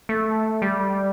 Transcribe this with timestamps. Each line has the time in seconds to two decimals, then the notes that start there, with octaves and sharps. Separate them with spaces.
0.09 A3
0.62 G3